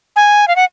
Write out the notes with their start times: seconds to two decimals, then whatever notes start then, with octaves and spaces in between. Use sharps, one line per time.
0.16 G#5
0.48 F5
0.56 F#5